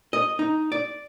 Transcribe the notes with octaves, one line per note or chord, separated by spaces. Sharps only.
D#5
D#4
D5